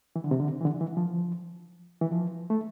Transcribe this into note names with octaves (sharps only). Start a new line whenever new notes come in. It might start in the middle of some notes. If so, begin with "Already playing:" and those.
E3
D3
C3
D3
E3
D3
E3
F3
E3
F3
A3